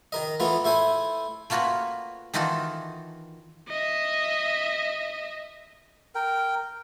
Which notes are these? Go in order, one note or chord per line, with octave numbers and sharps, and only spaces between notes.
D#3 A#4 D#5
E3 A3 B3 F4
A3 E4 C5 G#5
A3 A#3 F4 F#4 B4 C#5
D#3 E3 D#4 F4 F#4 A4
D#5 E5
A#4 G5